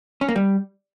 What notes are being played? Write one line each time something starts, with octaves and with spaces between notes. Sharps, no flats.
C#4
A#3
G3